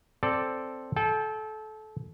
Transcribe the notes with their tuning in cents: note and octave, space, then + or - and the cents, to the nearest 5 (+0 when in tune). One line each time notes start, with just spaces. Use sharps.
C4 +0 A4 +0 D5 +0
A4 -25 G5 +15